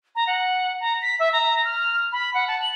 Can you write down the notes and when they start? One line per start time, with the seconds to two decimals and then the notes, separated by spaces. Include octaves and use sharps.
0.16 A#5
0.27 F#5
0.80 A#5
1.02 B6
1.20 E5
1.33 A#5
1.65 F6
2.12 B5
2.34 F#5
2.48 A5
2.62 F#7